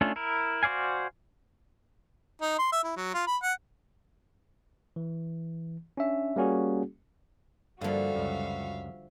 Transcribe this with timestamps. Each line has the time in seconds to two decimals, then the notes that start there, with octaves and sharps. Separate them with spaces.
0.01 A3 C#4 D4 F4
0.16 E4 A#4
0.63 F#4 C5 D5 F5 G#5
2.41 D#4
2.59 C6
2.72 E5
2.84 E4
2.97 F#3
3.14 F4
3.27 B5
3.42 F#5
4.96 E3
5.97 C#4 D4 E5
6.36 G3 A#3 C#4 F#4 G#4
7.81 G2 D3 F3 G3 A#3 F#4 E5 F5
8.15 C#2 F#2